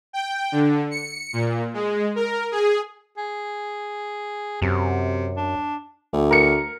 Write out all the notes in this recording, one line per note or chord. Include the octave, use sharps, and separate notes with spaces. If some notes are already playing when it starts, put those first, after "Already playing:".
G5
D3
C#7
A#2
G#3
A#4
G#4
G#4
F#2 C3
D4
D2
A#4 C#7